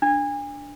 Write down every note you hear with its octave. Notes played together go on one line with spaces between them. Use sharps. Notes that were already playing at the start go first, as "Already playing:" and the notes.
D4